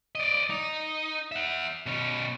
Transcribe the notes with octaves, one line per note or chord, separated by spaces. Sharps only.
D5 D#5
D#4
E5 F#5
B2 C#4